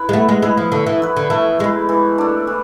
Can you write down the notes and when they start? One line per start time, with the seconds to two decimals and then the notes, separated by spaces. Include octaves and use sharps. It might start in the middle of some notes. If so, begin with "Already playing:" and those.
Already playing: E4 B4
0.09 G#3
0.13 A3 B3
0.29 G#3
0.42 G#3 E4 B4
0.57 F3
0.72 D3 A3
0.86 E3
1.02 E4 B4
1.16 D3
1.30 E3 A3
1.59 G#3 E4 B4
1.89 E3
2.18 A3 D4
2.47 E3